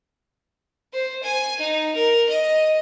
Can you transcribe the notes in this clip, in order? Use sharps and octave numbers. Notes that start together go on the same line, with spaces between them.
C5
G#5
D#4
A#4
D#5